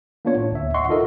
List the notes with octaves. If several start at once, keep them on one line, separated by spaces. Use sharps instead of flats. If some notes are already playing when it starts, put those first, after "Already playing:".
A#3 B3 D4 F4 C#5
A2
D2 E5
D#5 E5 F#5 C6 C#6
D#4 F4 A4 A#4 D#5 E5